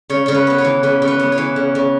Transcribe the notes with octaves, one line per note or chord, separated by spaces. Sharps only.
C#3 C#5
C#3 C#5
B4
B3 B4
C#5
E3
C#3 B4
C#3
B4
B3
C#5
E3
C#3
C#3